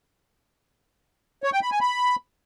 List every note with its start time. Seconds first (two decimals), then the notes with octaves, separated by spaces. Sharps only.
1.44 C#5
1.53 G5
1.62 B5
1.71 G#5
1.81 B5